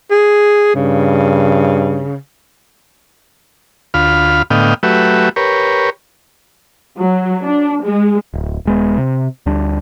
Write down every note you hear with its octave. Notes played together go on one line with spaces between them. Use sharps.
G#4
G2 C#3
D2 F4 F5 B5
A2 D3 B3 D#5 F5 G5
F#3 A3 F#4 G4 B4 E5
G4 A#4 B4 C#5
F#3
D4
G#3
D1
D#1 G#3 B3
C3
D2 G3 D4